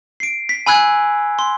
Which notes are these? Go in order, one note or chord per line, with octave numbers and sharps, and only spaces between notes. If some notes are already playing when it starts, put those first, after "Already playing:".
C7 D7
B6
G#5 B5 E6 F#6 G#6
C6